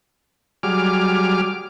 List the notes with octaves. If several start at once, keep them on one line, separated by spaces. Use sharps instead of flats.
F#3 G3 G#4 D6 F6